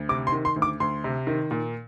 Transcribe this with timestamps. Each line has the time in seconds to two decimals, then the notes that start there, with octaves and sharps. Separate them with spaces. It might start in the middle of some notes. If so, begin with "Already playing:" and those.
Already playing: D2
0.09 C3 D6
0.27 C6
0.32 D#3
0.45 C6
0.56 D2
0.62 D6
0.80 D2 C6
1.04 C3
1.27 D#3
1.51 A#2